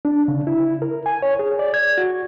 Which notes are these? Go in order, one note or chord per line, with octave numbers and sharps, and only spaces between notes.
D4
C#3
E4
A#4
G#5
C#5
G#4
D5
G#6
F#4